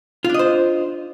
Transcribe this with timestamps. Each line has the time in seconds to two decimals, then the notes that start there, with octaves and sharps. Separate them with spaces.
0.25 F4
0.29 D4
0.34 D#5
0.39 C5